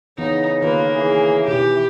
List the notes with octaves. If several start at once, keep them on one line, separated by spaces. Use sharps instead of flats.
C#3 E3 B3 D#4
D#3 A#3 F4 B4
E3 G#4
B2 E3 E4 G4